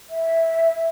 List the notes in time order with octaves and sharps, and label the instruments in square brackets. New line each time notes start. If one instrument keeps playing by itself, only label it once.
[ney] E5